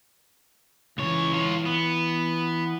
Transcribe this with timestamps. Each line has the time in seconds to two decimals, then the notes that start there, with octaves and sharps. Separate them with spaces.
0.98 C#2 E3 C#5
1.33 F4 C#5
1.66 B3